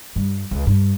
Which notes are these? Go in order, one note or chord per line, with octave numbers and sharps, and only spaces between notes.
G2 G3
C#2
G2